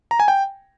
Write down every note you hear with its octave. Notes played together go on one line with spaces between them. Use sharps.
A#5
G#5
G5